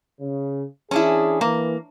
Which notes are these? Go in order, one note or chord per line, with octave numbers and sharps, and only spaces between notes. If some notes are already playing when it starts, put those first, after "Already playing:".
C#3
E3 C#4 D4 E4 G#4
E3 A#3